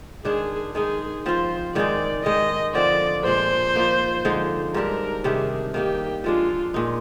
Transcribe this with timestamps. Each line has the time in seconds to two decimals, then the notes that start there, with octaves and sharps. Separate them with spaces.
0.25 D#3 G#3 D4 G#4
0.75 D#3 G#3 D#4 G#4
1.25 F3 C4 F4 C5
1.75 G#2 D#3 G#3 D#4 D5
2.24 D#3 G#3 D#4 D#5
2.75 D3 F3 C4 D5
3.25 A#2 G#3 D4 C5
3.75 F3 A#3 D#4
4.25 D3 F3 G#3 D#4
4.74 G#2 G3 D4 A#4
5.24 C3 D#3 G3 D4 G#4
5.74 D#3 A#3 D#4 G4
6.24 F3 G#3 D4 F4
6.74 A#2 G#3 D#4